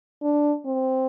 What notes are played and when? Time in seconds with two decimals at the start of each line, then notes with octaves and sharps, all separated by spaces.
0.23 D4
0.65 C4